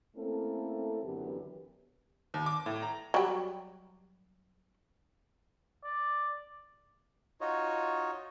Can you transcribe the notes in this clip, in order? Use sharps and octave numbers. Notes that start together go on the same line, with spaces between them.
A3 A#3 C4 C#4 E4 A4
F#2 D3 E3 B3 G4
D#2
D6
A2
A#5
F#3 G3
D5
D#4 F4 F#4 C#5 D#5